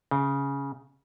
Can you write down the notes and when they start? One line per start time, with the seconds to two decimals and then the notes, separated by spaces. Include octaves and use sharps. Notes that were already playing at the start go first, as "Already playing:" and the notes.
0.11 C#3